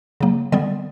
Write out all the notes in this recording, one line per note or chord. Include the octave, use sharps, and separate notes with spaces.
C#3 F#3 A#3
D3 G3 B3 D5